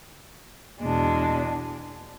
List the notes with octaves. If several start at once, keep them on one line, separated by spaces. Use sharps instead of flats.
E2 B2 G#3 D4